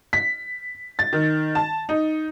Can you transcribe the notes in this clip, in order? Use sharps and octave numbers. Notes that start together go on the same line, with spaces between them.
B6
A6
D#3
A5
D#4